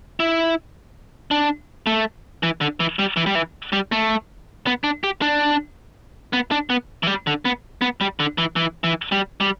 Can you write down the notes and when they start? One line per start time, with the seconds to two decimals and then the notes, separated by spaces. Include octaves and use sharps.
0.20 E4
1.31 D4
1.87 A3
2.43 E3
2.61 D3
2.80 E3
2.99 G3
3.17 E3
3.26 G3
3.35 E3
3.73 G3
3.92 A3
4.66 B3
4.84 D4
5.04 G4
5.22 D4
6.33 B3
6.51 D4
6.70 B3
7.03 E3
7.07 G3
7.27 D3
7.45 B3
7.81 B3
8.01 G3
8.20 D3
8.38 E3
8.56 E3
8.84 E3
9.12 G3
9.41 G3